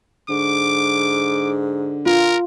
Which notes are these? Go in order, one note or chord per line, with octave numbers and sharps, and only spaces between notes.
G#2 D3 D6
F4 A#4